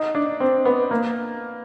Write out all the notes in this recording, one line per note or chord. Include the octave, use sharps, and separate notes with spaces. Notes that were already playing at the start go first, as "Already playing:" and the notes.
Already playing: D#4
D4
C4
B3
A#3